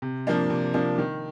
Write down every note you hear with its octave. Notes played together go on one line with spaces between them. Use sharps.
C3
F3 A#3 D4
C3
F3 A#3 D4
D#3